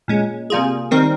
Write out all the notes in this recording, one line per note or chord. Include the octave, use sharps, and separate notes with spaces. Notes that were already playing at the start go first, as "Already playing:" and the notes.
A#2 G#3 C#4
C3 G3 A#3 F4 G#4
D#3 G3 C4 D#4 A#4